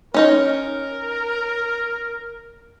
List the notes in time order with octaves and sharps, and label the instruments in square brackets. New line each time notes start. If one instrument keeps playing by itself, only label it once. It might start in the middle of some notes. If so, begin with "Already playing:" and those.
[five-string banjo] C#4 D#4 C#5 [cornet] A#4